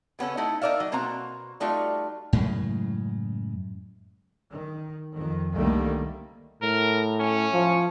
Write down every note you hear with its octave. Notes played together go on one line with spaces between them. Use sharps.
C#3 B3 C#4 A4
A3 D#4 E4 A4
D#4 A#4 D5 E5 F5
F#3
B2 A#3 C4 F#4 A#5
G3 A3 D#4 F4 F#4 D5
F#2 A2 C#3 G#3
D#3
F2 D#3
C2 D3 D#3 G3 A3 A#3
A2 A#4
C#4
F3